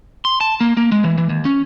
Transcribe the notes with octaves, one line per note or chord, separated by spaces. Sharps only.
C6
A5
A#3
A#3
G#3
E3
E3
D#2
C#4